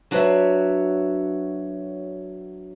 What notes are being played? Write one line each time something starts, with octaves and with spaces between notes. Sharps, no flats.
F#3 D4 F#4 B4 C#5 E5